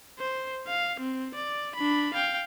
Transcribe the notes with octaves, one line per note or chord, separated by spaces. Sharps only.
C5
F5
C4
D5
D4 B5
F5 G5